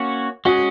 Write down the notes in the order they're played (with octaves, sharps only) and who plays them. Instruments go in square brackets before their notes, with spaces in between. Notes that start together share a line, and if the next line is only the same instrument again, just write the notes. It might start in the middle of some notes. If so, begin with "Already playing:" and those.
Already playing: [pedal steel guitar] A#3 C#4 F#4 C#5
[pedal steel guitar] G#3 C#4 G#4 [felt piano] F#4